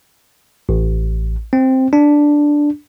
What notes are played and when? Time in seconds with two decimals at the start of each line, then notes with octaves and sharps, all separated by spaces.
0.69 A1
1.53 C4
1.93 D4